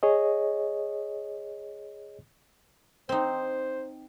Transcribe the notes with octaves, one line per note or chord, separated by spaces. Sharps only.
G#4 C#5 D#5
C4 D#4 C5